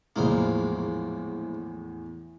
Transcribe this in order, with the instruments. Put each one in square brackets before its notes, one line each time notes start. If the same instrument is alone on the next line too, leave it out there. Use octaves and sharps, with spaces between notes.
[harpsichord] A#1 G#3 A#3 [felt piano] E2 A2